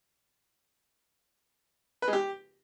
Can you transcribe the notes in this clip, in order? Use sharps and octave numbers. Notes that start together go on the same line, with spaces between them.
B4
G#3
G4